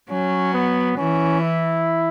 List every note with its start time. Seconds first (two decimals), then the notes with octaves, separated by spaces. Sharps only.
0.10 F#3 C#4
0.54 B3
0.98 E3 C#4
1.41 E4